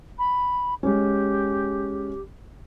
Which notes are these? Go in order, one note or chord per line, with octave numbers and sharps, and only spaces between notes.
B5
G#3 C#4 G4